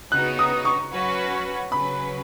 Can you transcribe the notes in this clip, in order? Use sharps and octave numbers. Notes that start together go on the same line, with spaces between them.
C#3 B3 D#4 F#4 F#6
D#6
C#6
F#3 C#4 F#4 B4
C#3 F#3 C#4 B4 B5